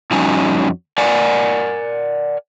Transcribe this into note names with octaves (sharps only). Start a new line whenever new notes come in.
F2 G3 C#4 D#4 F#4 G#5
A#4 D5 F#5 G#5